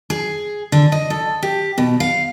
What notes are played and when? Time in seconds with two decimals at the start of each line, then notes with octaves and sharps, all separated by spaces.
0.10 G#4
0.72 D3
0.92 D#5
1.10 A4
1.43 G4
1.78 B2
2.00 F5